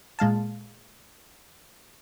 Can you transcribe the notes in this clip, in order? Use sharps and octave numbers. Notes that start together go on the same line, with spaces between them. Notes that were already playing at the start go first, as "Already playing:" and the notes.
A#2 G#3 F5 A5